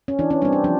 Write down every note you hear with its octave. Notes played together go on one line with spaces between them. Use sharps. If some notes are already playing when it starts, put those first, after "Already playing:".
C#4
E3 D4
C#4
G3 C4 D4
D4
F3 D4